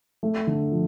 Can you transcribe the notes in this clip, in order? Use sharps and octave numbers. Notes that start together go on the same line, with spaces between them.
A3
D3
F3